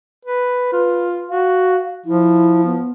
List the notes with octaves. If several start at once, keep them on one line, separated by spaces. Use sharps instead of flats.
B4
F4 B4
F#4 F5
F3 E4
B3